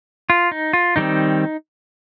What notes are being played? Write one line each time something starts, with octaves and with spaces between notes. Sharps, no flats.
F4
D#4
F4
D#3 G3 C4 D#4